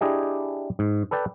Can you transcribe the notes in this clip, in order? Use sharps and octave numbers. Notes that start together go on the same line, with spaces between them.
D4 E4 G4 G#4 D#5
G#2
A4 B4 D5 G5